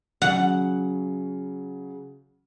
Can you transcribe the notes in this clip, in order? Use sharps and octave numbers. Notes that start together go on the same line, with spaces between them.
C#3 F#3 F#5